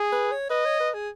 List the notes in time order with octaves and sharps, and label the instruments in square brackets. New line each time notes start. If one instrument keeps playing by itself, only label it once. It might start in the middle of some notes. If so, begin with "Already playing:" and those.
Already playing: [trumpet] G#4
[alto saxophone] B4
C#5
[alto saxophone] B4 [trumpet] D#5
[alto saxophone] C#5
B4
G#4